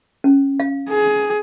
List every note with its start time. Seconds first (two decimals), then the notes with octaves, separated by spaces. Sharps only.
0.24 C#4
0.60 F5
0.90 G#4